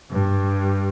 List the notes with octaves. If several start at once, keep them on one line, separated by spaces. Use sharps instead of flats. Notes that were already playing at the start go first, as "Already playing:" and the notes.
G2